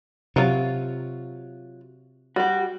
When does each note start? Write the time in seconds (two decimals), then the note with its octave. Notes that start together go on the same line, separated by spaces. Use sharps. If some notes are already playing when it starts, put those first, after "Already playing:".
0.36 C3 F#3 F4
2.36 G3 F#4 G4